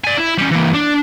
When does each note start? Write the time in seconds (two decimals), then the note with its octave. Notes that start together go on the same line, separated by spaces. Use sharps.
0.05 D5 G#5
0.18 E4
0.38 G3 C#4
0.51 E3 A#3
0.74 D4